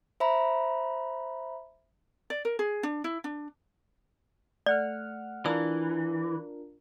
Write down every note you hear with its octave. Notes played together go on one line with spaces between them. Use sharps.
C5 E5 A#5 B5
D5
A#4
G#4
D4
E4
D4
A3 D5 F#5 F6
E3 D4 F4 A#4 E6